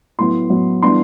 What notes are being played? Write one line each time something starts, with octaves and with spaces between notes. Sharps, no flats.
A2 F#3 B3 C6
A2 F#3 B3
E3 G3 B3 D4 C6